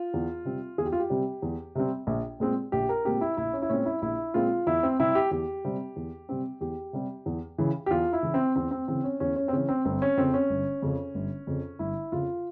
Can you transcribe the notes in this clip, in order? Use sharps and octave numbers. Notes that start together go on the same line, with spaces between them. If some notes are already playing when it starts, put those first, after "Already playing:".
Already playing: F4
E2
C3 G3 C4
E2 G#4
G4
F4
G4
C3 G3 C4
E2
C3 G3 C4
A#1
A#2 G#3 C4
A#1 G4
A#4
A#2 G#3 C4 G4
E4
A#1 E4
C#4
E4
A#2 G#3 C4 C#4
E4
A#1 E4
A#2 G#3 C4 F4
E2 E4
C4
C3 G3 C4 E4
G4
E2 G4
C3 G3 C4
E2
C3 G3 C4
E2 G4
C3 G3 C4
E2
C#3 E3
G4
E2 F4
E4
C#3 E3
C4
E2 C4
C4
C#3 E3 C4
C#4
E2 C#4
C#4
C4
C#3 E3 C#4
C4
G1 C4
C#4
F2 C#3 C4
C#4
G1
F2 C#3
G1
F2 C#3
G1 E4
F2 C#3 F4